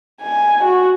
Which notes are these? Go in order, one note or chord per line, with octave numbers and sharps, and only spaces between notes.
G#5
F#4